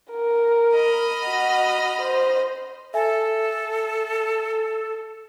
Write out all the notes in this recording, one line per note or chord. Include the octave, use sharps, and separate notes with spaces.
A#4
D#5 B5 F6
F#4
C5
A4 E5 G#5